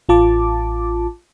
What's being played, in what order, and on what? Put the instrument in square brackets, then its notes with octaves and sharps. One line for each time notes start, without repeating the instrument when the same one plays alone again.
[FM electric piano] A1 F4 A5 D6